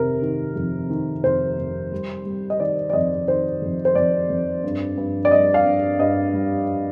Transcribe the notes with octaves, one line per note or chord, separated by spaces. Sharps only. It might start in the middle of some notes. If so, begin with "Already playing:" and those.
Already playing: F1 C3 D#3 A#4
D#3
F2
D#3
F1 C5
F1
G3
G3
D#5
D#3 D5
D5
F2 D#5
D#3 C5
F2
C5
F2 D5
F2
G2
G2
D5
G3 D#5
F5
G2
G2 D#5
G3